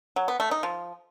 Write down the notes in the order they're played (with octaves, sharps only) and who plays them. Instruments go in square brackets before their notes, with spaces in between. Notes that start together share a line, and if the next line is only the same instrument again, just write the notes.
[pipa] F#3
B3
A3
D#4
F3